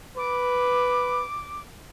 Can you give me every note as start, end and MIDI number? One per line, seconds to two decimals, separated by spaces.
0.17 1.24 71
0.17 1.60 86